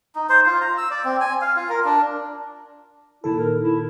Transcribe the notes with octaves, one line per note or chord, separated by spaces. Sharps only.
D#4
C5
F4
A#5
E6
D5
C4
G#5
F5
F4
A#4
D4
A#2 D#3 E4 A4
A#4
E4